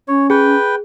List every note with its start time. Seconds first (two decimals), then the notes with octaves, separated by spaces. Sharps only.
0.08 C#4 C#5
0.30 G#4 B4 G5